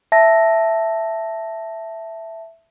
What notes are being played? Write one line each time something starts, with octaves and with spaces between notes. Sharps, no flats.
E5 A5 A#6